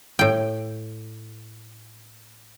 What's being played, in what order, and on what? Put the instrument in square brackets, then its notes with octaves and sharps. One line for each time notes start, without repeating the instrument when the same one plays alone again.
[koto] A2 G5